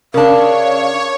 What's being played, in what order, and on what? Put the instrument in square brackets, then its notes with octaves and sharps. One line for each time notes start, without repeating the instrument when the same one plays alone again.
[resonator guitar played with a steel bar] C#3 D4 [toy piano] A#4 [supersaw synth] C#5 [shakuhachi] F5